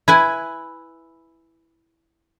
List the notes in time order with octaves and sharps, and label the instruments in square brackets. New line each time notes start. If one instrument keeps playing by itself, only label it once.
[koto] E4 B4 G#5